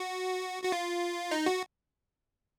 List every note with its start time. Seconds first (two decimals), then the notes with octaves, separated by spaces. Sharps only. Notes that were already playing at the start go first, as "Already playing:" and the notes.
Already playing: F#4
0.63 F#4
0.72 F4
1.31 D#4
1.46 F#4